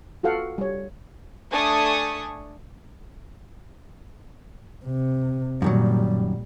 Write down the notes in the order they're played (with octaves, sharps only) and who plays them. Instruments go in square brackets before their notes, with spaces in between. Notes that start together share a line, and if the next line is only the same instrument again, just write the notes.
[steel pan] F4 F#4 A4 F5 F#5
G3 C#5
[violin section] A3 D4 A4 G#5 C#6 D#6
[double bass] C3
[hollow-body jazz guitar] F#2 D#3 F#3 [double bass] A#2 G3